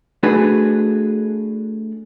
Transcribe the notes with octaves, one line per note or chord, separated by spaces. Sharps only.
A3 D4 F#4 G#4 B4